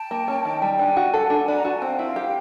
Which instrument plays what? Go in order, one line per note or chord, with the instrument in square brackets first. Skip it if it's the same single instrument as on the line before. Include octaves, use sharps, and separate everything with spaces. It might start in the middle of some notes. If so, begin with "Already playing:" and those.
Already playing: [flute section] G5 A5
[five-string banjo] A#3
C#4
D#3
G3
[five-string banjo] D4 [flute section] F#5 G#5
[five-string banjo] F#4
A4
D4
[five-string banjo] D4 [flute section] B5
[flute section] A#5
[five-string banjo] F#4 [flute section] A5
[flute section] G#5
[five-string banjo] C4 [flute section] F5 G5
[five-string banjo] E4
G4